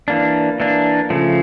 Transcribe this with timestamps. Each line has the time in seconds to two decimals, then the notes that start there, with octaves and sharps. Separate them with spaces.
0.08 E3 A#3 D4
0.60 E3 A#3 D4
1.10 C#3 F3 A3